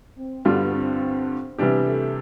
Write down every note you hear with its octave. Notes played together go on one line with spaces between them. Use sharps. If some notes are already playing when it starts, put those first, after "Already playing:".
C4
G2 D3 G3 B3 D4 F4
C4
C3 E3 G3 B3 D4 G4
A3